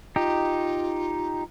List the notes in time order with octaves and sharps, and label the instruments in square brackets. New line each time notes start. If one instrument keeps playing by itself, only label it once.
[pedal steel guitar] D#4 G4 [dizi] F4